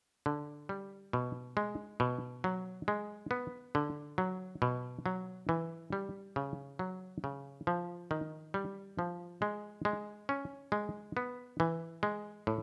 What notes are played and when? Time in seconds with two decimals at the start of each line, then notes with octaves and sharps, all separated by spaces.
0.26 D3
0.69 G3
1.13 B2
1.57 G#3
2.00 B2
2.44 F#3
2.88 G#3
3.31 B3
3.75 D3
4.18 F#3
4.62 B2
5.06 F#3
5.49 E3
5.93 G3
6.36 C#3
6.79 F#3
7.24 C#3
7.67 F3
8.11 D#3
8.54 G3
8.99 F3
9.42 G#3
9.85 G#3
10.29 C#4
10.72 G#3
11.17 B3
11.60 E3
12.03 G#3
12.47 A2